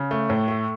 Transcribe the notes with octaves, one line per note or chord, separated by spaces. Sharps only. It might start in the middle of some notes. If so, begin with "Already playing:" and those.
Already playing: C#3
A3
A2
A3